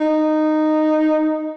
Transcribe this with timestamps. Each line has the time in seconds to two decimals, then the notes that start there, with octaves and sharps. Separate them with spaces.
0.01 D#4